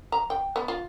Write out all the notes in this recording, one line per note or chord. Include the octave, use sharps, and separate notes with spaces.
A#5
G5
B3
F4